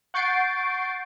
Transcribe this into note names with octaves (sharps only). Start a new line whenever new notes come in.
F#5 C#6 G6 A6 C7 D7